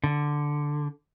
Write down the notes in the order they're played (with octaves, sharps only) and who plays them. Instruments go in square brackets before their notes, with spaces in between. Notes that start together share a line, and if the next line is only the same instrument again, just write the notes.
[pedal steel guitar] D3